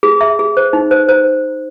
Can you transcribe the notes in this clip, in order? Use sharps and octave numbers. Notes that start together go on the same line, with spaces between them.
G#4
E5
G#4
C5
D#4
C5
C5